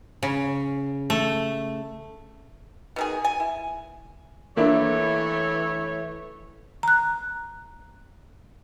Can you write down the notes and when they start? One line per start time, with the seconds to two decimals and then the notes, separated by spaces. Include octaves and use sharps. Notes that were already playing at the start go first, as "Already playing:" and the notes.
0.23 C#3
1.10 A3
2.96 B2 D#3 G#4
3.24 G#5
3.40 E4
4.57 E3 A3 A#3 D4 E4 C#5
6.83 A#5 F#6